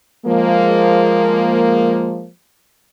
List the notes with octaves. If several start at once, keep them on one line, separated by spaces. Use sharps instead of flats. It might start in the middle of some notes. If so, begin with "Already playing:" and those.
F3 G#3 A#3